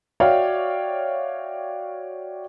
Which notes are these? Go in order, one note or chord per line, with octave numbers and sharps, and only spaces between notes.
F#4 C#5 D5 E5 F5 G5